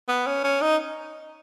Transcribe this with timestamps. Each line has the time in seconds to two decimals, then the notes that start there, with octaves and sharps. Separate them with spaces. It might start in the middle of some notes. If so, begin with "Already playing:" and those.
0.08 B3
0.27 C#4
0.44 C#4
0.62 D#4